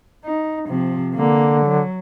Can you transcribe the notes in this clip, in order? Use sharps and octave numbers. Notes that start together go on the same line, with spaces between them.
D#4
C3 F3
D3 A#3
F#3